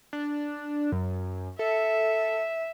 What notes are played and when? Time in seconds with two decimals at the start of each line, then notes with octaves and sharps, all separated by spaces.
0.13 D4
0.92 F#2
1.59 A4 E5